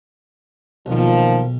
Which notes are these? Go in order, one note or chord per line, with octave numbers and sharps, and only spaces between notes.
B1 A#2 D#3 F3